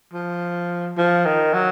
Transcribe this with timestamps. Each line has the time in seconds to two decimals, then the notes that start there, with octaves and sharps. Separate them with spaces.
0.13 F3
0.97 F3
1.25 D#3
1.53 F#3